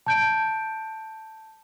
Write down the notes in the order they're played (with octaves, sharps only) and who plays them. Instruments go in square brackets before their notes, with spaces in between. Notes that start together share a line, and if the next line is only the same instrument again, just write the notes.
[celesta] A5 G6 D7